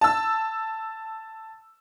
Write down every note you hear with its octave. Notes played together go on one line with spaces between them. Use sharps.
A5 E6